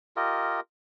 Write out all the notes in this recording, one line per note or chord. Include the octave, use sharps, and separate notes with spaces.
F4 G4 A#4 D#5